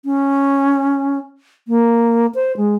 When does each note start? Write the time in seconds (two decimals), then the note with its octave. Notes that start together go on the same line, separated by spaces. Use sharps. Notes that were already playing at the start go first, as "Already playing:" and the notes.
0.05 C#4
1.68 A#3
2.35 C5
2.57 G#3